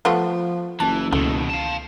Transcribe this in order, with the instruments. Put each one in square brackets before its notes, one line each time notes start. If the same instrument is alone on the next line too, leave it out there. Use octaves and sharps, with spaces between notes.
[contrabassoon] F3 [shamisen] A3 B3 F4 [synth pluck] F#5
[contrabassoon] F#1 [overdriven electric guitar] E3 [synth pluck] A5
[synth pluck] C#2 [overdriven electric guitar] B2 D#3 [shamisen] A3
[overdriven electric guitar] F5 A5